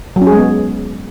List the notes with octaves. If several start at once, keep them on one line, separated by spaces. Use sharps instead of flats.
F#3
C#4
G#4
G#3
B3